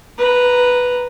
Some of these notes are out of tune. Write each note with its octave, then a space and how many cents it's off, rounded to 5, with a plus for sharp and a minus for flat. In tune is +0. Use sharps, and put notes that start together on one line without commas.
B4 +0 A#5 +0